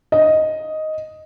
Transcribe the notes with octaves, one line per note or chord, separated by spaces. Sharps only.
D#5